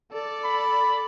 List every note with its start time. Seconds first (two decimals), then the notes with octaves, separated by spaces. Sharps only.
0.12 A4 D5
0.44 B5